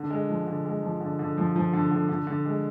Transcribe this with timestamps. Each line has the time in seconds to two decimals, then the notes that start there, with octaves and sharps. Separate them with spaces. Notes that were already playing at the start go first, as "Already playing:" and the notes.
Already playing: D3
0.10 G#3
0.29 F3
0.47 D3
0.65 G#3
0.83 F3
1.00 D3
1.19 D3
1.37 F3
1.56 F3
1.73 D3
1.91 D3
2.09 D3
2.27 D3
2.45 G#3